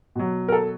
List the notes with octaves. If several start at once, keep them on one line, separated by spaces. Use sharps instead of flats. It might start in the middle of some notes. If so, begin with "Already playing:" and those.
B2 F#3
A#4
A4